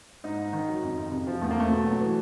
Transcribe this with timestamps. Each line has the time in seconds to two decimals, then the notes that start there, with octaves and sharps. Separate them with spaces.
0.24 G#2 D#4
0.39 G#2
0.53 D#3
0.68 F#3
0.83 F2
0.97 F2
1.12 C3
1.27 F3
1.41 E2 A3
1.51 A#3
1.57 E2 A3
1.71 B2
1.86 F#3
2.01 E3